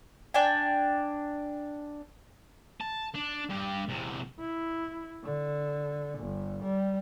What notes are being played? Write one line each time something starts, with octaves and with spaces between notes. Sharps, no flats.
D4 D5 G5 G#5
A5
D4
G2 G4
E2 C3
E4
D3
G1
G3